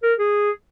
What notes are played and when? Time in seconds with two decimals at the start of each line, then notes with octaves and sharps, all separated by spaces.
0.03 A#4
0.19 G#4